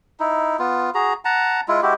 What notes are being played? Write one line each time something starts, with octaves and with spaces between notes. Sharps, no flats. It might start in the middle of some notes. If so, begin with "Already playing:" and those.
D#4 E4
B3 F4
F#4 G#4 A#5
F#5 A5 A#5
G#3 E4 F4
G#3 E4 F#4 G4